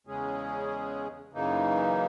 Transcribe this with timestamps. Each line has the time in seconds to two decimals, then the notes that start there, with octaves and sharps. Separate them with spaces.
0.07 E2 C#3 G#3 C#4 G#4
1.33 F#2 C#3 E3 A#3 D#4